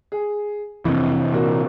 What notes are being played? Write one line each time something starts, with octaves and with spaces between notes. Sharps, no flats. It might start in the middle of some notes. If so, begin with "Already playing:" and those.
G#4
F2 C3 E3
A#2 A#3 F#4